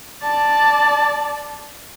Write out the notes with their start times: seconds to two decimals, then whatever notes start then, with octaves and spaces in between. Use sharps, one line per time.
0.24 D5 A5